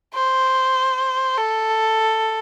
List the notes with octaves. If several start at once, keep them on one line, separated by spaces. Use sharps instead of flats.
C5
A4